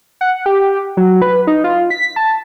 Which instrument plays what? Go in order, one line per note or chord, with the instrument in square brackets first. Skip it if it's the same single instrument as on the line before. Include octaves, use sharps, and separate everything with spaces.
[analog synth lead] F#5
G4
F#3
B4
D#4
F4
B6
A5